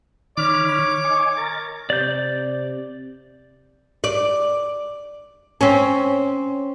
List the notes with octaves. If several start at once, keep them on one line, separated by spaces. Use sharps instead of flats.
D#3 C#5 B5 D6 F6
D#5 G#5 C#6
A#4 A#5 A6
C3 D5 G6
D5
C4 C#4